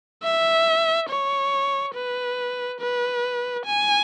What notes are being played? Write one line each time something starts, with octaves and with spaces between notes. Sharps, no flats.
E5
C#5
B4
B4
G#5